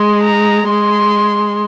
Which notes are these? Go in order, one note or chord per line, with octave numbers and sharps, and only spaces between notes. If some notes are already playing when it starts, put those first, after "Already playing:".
Already playing: G#3 C6
A#5
G#3 C6